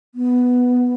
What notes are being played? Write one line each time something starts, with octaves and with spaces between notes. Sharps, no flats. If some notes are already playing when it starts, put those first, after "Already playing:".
B3